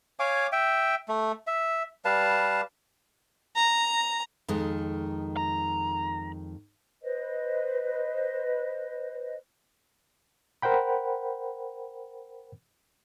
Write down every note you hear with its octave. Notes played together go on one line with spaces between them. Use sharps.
C#5 F5 G#5 D6
E5 G5
A3
E5
G3 B4 F5 A5
A#5
F2 D#3 G#3
A#5
B4 C5 D#5
A#4 C5 F#5 G5 B5